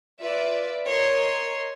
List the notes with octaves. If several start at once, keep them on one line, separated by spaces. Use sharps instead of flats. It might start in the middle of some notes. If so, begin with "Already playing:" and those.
F4 B4 D5 E5
A#4 C#5 D#5 C6